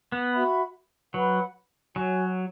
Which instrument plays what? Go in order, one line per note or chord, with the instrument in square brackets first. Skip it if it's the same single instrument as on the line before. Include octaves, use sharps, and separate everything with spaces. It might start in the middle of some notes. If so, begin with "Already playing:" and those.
[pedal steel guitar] B3
[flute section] F#4 E5 B5
[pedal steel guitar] F#3 [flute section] B4 F#5 B5
[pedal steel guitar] F#3 [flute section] F#4 C#5 G#5